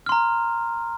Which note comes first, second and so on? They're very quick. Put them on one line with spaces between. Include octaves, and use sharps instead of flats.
F6 C6 A#5